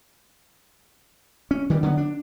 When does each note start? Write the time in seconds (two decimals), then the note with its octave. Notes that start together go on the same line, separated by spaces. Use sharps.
1.51 C#4
1.70 D#3 E3 G3
1.83 D3 F#3 G#3 B3
1.97 D4